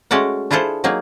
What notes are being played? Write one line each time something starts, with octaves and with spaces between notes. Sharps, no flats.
G#3 A3 C#4 F#4 D5 F#5
D4 E4 F4 G#4 A4 C5
F#3 A#3 D#4 G#4